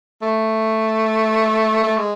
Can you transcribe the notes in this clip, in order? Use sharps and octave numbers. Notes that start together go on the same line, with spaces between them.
A3
A3
G#3